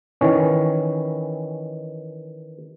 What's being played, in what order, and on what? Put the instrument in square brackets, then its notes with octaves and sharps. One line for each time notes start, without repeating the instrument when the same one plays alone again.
[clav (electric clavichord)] D#3 E3 C#4